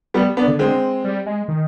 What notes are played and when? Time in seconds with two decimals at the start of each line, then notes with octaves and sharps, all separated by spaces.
0.14 G3 B3
0.37 B3 D4
0.48 D3
0.59 G#3 C4
1.04 G3
1.26 G#3
1.48 D#3